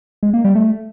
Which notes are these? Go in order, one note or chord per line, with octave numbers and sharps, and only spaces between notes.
G#3
A#3
G3
A3